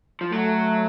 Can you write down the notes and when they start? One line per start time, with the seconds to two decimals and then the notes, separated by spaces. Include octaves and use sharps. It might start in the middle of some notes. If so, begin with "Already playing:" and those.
0.21 F3
0.32 F#3 A3